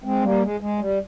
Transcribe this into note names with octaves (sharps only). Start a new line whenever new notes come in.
G#3 C4
G3 A#3
G#3
G#3
G3